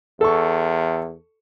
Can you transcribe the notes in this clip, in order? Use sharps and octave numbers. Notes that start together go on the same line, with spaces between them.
E2 A4 C#6